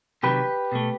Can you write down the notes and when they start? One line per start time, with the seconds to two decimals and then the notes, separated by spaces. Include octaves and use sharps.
0.23 C3 D#3 F#3 G4 B4
0.72 B2 A3